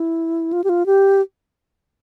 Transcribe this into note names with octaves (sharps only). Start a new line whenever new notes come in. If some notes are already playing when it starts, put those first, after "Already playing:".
Already playing: E4
F4
G4
F4
G4